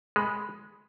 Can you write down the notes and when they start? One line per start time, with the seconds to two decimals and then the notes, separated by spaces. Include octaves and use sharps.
0.16 G#3 B5